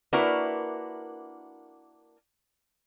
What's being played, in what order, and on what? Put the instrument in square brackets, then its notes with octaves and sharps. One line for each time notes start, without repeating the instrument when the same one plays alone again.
[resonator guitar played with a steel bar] A#3 D4 E4 F#4 A#4 B4